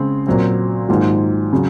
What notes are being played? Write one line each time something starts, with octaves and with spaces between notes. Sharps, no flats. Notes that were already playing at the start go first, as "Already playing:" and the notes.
Already playing: C#3 G#3 C4
A#2 F#3 C4
G#2 D#3 F#3 A#3 F4
C#3 F#3